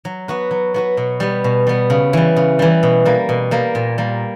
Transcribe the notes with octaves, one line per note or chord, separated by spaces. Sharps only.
F#3
B3 F#4 B4
F#3
B3 F#4 B4
B2
G3 B3
B2
G3 B3
C#3
E3 G3
C#3
E3 G3
B2
G3 A#3
B2
G3 A#3
A#2
G3 A#3